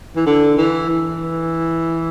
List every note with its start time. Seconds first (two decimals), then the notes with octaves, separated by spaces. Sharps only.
0.16 E3
0.26 D3
0.58 E3
0.90 E3